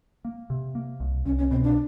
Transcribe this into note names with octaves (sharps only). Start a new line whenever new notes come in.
A#3
C3
A#3
C2
C2 C#4
C#4
B2 C4
D4